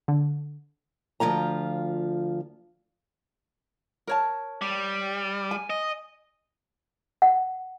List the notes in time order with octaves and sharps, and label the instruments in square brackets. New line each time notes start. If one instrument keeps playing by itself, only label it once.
[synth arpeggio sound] D3
[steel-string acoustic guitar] D2 G#2 F3 F4 A#5
[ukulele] A#4 C#5 A5
[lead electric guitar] G3
[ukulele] G#5
[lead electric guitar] D#5
[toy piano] F#5